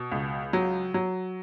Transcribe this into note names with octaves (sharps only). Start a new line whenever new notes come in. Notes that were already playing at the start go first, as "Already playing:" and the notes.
Already playing: B2
C#2
F#3
F#3